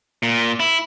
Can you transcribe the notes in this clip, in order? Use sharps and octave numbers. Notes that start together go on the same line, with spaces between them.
A#2
E4